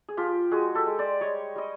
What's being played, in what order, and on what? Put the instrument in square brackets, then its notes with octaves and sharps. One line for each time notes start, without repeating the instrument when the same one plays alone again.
[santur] G#4
F3 F4 G4
G#3 F#4 G#4
G4 A4
G#3
C5 D5
G3 C#5 D#5
G3 D#5